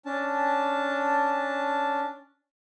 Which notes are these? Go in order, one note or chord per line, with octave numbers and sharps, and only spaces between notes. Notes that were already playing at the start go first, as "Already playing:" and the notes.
C#4 D4 A5